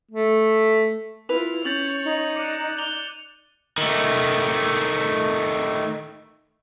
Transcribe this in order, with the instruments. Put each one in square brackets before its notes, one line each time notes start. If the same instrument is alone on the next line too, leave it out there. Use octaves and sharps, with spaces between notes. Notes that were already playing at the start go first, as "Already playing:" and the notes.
[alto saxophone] A3
[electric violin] E4 F4 [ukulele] B4 [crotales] F7
[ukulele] C#4 [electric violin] C#5 [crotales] G6 A6 F#7
[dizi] D#4
[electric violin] D5 F#6 [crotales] D6 C#7 D#7
[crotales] F7 G7
[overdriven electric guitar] D#3 A3